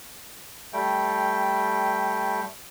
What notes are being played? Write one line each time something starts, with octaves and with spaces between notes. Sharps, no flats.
G3 A3 G5